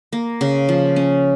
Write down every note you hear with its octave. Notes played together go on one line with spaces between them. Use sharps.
A#3
C#3
F3
C#4